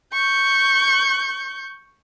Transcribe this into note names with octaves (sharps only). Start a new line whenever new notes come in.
C#6 G6